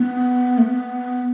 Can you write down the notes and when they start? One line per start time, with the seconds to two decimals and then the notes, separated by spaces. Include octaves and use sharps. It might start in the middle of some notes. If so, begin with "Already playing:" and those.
Already playing: B3
0.58 A3
0.62 B3